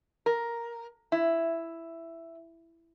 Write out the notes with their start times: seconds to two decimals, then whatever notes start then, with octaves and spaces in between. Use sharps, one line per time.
0.26 A#4
1.12 E4